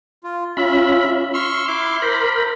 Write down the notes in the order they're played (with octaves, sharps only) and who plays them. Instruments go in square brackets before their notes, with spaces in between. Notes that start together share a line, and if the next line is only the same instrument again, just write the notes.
[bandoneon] F4
[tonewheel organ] C#4 F4 B5 [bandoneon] E5
[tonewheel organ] C6 [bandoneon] C#6 E6 F6
[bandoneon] E4 D6
[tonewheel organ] A#4 B5 [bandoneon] C5